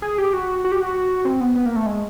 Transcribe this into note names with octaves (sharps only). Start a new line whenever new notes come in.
G#4
G4
F#4
F#4
G4
F#4
C4
B3
B3
A#3
A3
G#3